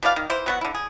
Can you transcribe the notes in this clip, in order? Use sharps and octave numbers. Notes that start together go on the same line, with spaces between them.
B2 E3 D5 F5
D#3
E3 E4 C5
F#3 B3 F#4
D3 E4
G#4